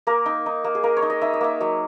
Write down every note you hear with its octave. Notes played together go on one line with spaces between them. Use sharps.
A#3 A#4
D#4
D#4
A#3
G#4
A#3 A#4
C#5
D#4
D#5
D#4 E5
D#5
A#3 E5
F#3 D#5